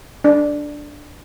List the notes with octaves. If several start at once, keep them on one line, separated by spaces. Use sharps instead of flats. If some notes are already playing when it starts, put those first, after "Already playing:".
D4